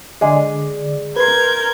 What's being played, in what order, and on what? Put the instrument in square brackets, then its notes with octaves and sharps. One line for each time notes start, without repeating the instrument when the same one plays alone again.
[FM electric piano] D3 D5 [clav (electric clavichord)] G#3 G#4
[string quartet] A#4 G6 G#6 [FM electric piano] B4 C6